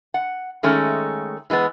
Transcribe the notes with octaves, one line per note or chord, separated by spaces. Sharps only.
F#5
D#3 G#3 A3 C#4
E3 G#3 A#3 B3